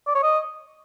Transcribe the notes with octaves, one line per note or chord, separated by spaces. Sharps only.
D5
C#5
D#5